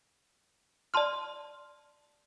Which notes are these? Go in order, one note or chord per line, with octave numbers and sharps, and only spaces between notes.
D5 A5 C6 F6